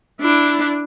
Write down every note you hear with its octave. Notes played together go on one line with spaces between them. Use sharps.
D4 E4